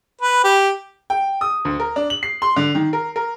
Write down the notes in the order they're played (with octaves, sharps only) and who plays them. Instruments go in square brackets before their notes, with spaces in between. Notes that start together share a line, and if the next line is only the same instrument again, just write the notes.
[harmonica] B4
G4
[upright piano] G5
D#6
D2
A#4
D4
F#7
C7
C6
D3
D#3
A#4
A#4